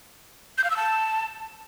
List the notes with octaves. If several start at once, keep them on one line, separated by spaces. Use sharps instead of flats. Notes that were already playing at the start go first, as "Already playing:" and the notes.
G6
F5
E6
A5